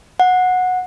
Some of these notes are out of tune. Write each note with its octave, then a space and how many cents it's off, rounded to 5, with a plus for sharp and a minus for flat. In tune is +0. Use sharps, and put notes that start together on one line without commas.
F#5 -15